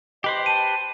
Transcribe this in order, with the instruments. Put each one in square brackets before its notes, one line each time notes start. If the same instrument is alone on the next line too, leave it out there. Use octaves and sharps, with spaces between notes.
[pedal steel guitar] G4 B4 C5 [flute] D#5
[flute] A5 [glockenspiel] D#7